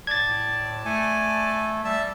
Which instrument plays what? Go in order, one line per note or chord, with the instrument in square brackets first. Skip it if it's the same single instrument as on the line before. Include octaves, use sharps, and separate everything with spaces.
[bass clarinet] A2 [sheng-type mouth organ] D5 A5 [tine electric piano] G#6 A6
[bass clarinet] A3 [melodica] G#5
[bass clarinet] G3 [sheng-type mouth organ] E5 A5